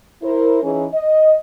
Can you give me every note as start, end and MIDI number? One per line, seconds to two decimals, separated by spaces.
0.23 0.61 64
0.23 0.61 70
0.23 0.61 72
0.63 0.87 52
0.63 0.87 61
0.63 0.87 63
0.63 0.87 68
0.94 1.36 75